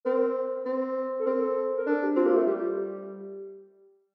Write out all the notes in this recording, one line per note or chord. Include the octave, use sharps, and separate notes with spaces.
C4 A#4
C4
A4
C4 A#4
A4
A#4
D4 A4
G4
C4 F4
A#3 G4
F4
A3
G3 G4